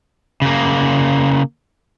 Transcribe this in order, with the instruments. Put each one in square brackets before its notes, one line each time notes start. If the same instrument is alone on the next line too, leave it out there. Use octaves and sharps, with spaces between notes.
[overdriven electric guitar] C#3 A#3